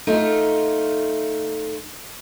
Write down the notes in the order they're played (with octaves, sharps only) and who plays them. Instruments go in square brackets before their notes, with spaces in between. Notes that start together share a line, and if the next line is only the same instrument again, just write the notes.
[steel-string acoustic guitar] A3 D#4 F4